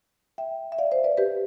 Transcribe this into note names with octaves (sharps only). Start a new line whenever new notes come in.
E5 G5
E5
D5 F5
C5 E5
B4 D5
G4 B4